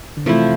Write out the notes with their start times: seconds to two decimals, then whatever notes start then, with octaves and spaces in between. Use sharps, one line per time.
0.17 D3
0.26 C3 E3 F3 A3 E4